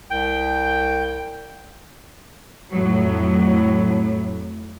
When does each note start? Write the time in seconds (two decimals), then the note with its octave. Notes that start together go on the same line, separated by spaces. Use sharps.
0.11 C2 G5
2.73 F2 A2 F#3